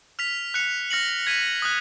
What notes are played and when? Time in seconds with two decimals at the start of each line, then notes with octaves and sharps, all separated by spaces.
0.19 F6 B6 F7
0.54 F#6 C#7 F7
0.90 F6 A#6 C#7 F#7
1.27 G#6 B6 D#7
1.62 D#6 F#6